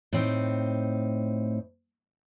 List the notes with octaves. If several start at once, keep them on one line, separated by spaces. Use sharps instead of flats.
A2 C4 D#4